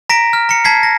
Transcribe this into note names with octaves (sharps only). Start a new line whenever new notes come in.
A#5 A#6 B6 D7
F6
A#5 C#7
A5 G#6 B6 C7
A#6